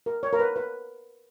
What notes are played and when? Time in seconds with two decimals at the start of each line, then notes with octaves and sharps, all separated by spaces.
0.06 A#4
0.23 C#5
0.33 A#4
0.39 B4
0.56 B4